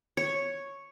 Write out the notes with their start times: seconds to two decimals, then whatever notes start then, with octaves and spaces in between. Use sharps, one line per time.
0.17 C#5